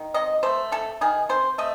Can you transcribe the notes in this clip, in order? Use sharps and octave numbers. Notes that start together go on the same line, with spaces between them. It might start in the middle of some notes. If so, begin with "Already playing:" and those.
Already playing: D#3
C3 D#5
A3 C5
C3 A4
D#3 G#4
C3 C5
A3 D#5